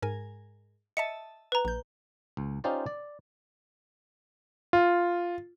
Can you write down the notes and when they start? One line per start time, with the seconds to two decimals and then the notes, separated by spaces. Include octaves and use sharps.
0.02 G#2 A#4 G#5
0.97 D#5 E5 A5 C#7
1.52 B4 A#5
1.65 A#1 G6
2.37 C#2
2.64 C#4 D#4 F4 G4 C5 D5
2.86 D5
4.73 F4